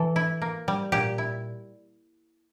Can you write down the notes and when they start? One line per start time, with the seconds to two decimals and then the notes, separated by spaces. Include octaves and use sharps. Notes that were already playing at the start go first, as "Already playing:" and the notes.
Already playing: E3 A4
0.16 E4
0.42 A#3
0.68 G3
0.92 A#2 G4
1.18 E4